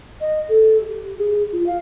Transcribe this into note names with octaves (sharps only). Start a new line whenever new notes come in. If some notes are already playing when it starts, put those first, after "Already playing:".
D#5
A4
G4
G#4
F4
F5